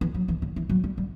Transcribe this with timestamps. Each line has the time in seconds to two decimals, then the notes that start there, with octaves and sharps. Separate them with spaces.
0.01 E3
0.14 F#3
0.28 E3
0.42 D3
0.56 E3
0.69 F#3
0.84 G3
0.98 G3